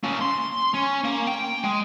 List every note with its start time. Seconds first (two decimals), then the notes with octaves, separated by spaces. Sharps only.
0.03 A#3 C#4
0.21 C6
0.74 C#4
1.04 A#3
1.27 G5
1.64 G#3